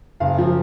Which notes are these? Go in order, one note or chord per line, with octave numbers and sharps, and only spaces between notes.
F#1 F5
F3